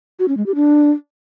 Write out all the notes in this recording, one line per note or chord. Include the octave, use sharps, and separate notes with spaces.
F#4
C#4
G#3
G4
D4